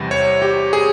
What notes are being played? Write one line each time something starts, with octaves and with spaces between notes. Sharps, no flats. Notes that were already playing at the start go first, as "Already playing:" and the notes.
Already playing: E2 C3 E3 G3
C#5
G4
G#4